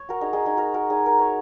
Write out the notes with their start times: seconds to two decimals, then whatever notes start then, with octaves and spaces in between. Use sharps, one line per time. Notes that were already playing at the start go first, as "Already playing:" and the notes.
Already playing: C#5
0.09 F#4 A#4
0.21 D#4 G#4
0.33 D#4 G#4
0.45 D#4 G#4
0.57 F#4 A#4
0.74 F#4 A#4
0.90 D#4 G#4
1.06 A#4
1.19 C#5